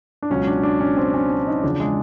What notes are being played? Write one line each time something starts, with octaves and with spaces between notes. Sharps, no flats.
D4
C#2 B2 F#3 C#4
D4
D4
C#4
C4
C#4
D4
D#4
E2 C#3 F3 D4
G#3